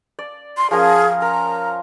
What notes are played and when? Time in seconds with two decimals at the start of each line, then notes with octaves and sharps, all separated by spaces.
0.19 D5
0.57 C6
0.71 F3 C#4 G#4 A#4
1.22 A#4 A#5